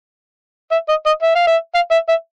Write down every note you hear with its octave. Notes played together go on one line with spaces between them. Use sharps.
E5
D#5
D#5
E5
F5
E5
F5
E5
E5